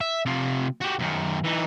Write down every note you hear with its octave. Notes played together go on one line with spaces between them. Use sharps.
E5
C3 F4
F#4 G4
F#2 D#3
E3 D#4